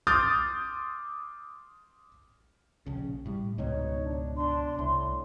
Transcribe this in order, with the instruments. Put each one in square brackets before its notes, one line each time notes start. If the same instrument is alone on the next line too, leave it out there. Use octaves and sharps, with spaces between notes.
[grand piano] C6 D6 D#6 F6 G6 A6
[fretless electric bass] A#1 C#3
A2 G3
[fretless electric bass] C#2 G#2 B2 [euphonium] D#4 [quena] C#5
[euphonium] D4
[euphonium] D4 [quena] C6
[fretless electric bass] C2 [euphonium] A2